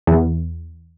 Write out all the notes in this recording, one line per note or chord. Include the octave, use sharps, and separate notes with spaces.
E2